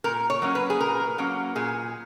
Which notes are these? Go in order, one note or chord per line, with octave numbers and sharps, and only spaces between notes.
A#2 A#4
C#5
F#3 A#3 C#4
B4
G#4
A#2 A#4
F#3 A#3 C#4
A#2 G#4